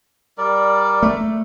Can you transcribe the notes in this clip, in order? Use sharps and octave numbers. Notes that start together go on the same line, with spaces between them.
G3 A#4 D5
A3